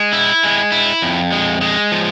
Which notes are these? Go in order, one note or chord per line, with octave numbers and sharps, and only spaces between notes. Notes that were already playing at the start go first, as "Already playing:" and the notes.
Already playing: G#3
E4
G#3
E4
F2
G#3
G#3
F3